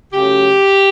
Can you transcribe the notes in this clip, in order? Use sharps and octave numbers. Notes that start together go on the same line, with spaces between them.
C#3 F#3 A3 G4